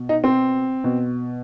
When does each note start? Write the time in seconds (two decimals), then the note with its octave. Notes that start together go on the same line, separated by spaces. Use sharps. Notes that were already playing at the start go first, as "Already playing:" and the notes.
Already playing: B2
0.09 D#4
0.24 C4
0.84 B2